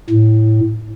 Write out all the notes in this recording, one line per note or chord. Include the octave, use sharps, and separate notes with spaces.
A2